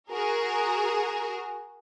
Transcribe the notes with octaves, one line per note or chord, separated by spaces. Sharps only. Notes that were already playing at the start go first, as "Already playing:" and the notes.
F#4 G#4 A#4